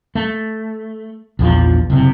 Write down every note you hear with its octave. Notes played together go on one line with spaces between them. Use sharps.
A3
A#1 E2 F3
F#1 C3